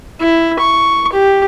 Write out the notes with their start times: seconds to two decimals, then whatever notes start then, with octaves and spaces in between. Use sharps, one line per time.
0.20 E4
0.59 C#6
1.13 G4